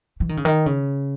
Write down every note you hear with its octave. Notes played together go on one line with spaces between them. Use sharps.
E3
D#3
C#3
D#3
C#3